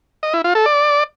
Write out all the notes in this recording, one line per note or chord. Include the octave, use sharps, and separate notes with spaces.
D#5
E4
F4
A4
D5